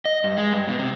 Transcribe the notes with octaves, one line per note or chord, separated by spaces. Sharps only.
D#5
G2
G#3
G2
B2
C3